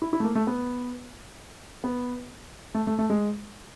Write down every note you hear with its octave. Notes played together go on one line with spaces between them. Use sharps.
E4
E4
A3
A#3
A3
B3
B3
A3
A3
A3
G#3